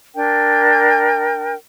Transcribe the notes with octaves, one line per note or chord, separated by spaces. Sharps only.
D4 A#4 G5